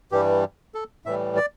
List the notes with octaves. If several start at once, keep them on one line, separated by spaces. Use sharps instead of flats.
G2 E3 G3 G4
A4
A2 E3 G3 E5
D5